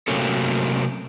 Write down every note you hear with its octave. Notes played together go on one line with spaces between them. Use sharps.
C3 F#3 A3 A#3 C#4 A4